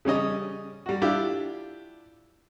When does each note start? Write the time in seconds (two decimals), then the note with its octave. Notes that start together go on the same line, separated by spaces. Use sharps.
0.05 C#3 G3 C#4 D#5
0.86 G3 F#4
1.02 D4 E4 F4 G4